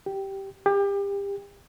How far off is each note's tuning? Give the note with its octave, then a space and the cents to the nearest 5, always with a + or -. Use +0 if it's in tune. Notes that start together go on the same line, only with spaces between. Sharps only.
G4 -10
G4 +30